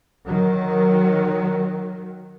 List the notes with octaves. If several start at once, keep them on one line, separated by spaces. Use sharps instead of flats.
D#3 F#3